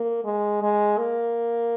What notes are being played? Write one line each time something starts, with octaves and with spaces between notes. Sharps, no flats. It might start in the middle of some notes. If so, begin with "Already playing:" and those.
Already playing: A#3
G#3
G#3
A#3